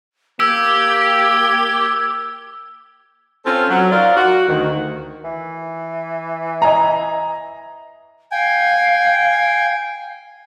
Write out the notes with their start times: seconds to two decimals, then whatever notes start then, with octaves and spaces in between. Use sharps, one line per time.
0.40 A#3 G4 E6 G#6
3.46 C4 C#4 F4 A4 C5
3.70 F#3
3.91 D#4 F4 A#4 D5 F5
4.17 F#4
4.48 D2 D#3
5.24 E3
6.62 D#5 G#5 A#5
8.32 F5 G5 G#5